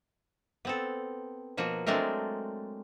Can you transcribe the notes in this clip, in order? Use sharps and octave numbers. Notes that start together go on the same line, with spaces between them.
B3 C4 A4
B2 F3 A#3 F#4
F#3 G#3 A3 C4 D4 A#4